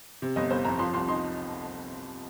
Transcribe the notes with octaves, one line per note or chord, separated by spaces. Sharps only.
C3
G1 D#5
G1 C5
F2 A#5
F3 C6
C2 C6
D#4 C6